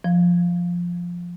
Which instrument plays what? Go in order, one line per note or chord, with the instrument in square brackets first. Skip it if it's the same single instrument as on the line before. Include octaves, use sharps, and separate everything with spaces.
[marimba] F3